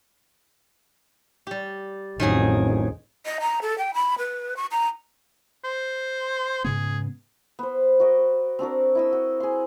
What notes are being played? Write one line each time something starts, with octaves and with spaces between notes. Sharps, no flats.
G3 G4
A1 F2 D#3 F#3 G#4
D#5
A#5
A4
G5
B5
B4
C#6
A#5
C5
G#2 C#3 B3 G#4
B3 C5
F#4 A#4 D#5
C4 D4 F#4 A#4
E4 D#5 E6
F#4
G#4 C6